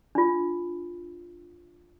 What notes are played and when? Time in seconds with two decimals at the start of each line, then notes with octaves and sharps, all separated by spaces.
0.15 D4 F4